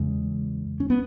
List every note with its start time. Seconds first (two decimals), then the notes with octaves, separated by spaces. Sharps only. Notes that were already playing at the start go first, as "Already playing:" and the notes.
Already playing: E2 C#3 G#3
0.80 C#4
0.90 B3